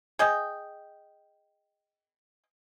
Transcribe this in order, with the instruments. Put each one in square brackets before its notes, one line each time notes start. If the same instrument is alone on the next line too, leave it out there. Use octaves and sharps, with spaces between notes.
[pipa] G#4 D#5 G5